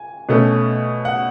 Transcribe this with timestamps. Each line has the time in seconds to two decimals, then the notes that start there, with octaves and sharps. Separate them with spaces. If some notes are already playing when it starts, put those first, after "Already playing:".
Already playing: G#5
0.29 B2 A3 C#4
1.05 F#5